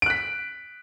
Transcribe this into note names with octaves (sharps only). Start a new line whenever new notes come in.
F#6 B6 D7